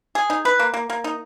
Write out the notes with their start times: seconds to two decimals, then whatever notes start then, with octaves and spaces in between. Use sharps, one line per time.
0.15 G#4
0.30 D#4
0.45 B4
0.60 A#3
0.74 A#3
0.90 A#3
1.04 D#4